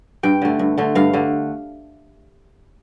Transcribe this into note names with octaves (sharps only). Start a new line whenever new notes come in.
G2 G5
D3 A3
G2
D3 A3
G2 F5
D3 A3